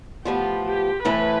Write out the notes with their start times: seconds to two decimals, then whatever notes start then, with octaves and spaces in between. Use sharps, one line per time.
0.24 A2 F3 B3 F4 G4
0.65 G4
1.05 A2 E3 A3 C4 E4 B4